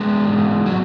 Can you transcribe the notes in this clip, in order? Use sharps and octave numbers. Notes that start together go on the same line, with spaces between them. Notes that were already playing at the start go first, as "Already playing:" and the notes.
Already playing: G#3 B3
G#2 E3
F#3